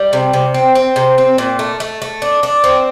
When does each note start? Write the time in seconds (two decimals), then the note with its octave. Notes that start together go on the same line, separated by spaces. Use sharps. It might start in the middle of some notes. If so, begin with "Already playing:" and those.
Already playing: G3
0.13 C3
0.33 C3
0.54 C4
0.75 C4
0.96 C3
1.18 C4
1.38 A#2
1.59 A3
1.80 A3
2.02 A3
2.22 D4
2.43 D4
2.64 C4